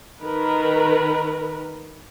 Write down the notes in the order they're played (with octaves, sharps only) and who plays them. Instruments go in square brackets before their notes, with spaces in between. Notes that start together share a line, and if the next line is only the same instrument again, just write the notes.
[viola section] D#3 A#4 B4